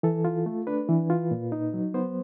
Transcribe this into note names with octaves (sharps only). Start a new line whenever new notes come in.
E3 A4
F4
A3
D4 B4
E3
F4
A#2
D#4
F#3
B3 C5